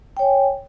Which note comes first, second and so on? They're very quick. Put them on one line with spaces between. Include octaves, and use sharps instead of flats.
G5 C#5 G#5